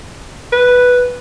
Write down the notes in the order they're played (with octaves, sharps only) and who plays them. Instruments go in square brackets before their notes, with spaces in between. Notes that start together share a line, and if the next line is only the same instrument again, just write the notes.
[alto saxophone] B4